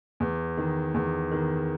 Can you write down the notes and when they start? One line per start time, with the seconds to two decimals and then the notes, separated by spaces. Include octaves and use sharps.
0.20 E2
0.57 D#3
0.94 E2
1.31 D#3